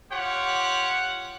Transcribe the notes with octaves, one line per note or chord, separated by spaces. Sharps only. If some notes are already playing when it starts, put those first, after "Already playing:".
F4 G4 C#5 F#5